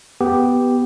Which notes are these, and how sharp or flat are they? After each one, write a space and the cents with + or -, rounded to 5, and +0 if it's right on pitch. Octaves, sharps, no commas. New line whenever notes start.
B3 +0 G4 +0